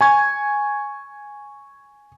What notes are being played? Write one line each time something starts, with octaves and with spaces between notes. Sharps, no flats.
G#5 C#6 G#6